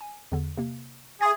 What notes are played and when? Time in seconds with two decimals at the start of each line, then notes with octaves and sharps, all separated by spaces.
0.01 G#5
0.32 E2 D3
0.57 C3 A#3
1.21 G#4 E5 C6 A6